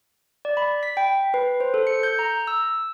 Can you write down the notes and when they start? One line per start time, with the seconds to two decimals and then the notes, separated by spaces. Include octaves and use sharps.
0.45 D5
0.57 B5
0.83 B6
0.97 G5
1.34 B4
1.60 C5
1.74 A4
1.87 C#7
2.03 G6
2.19 A#5
2.47 E6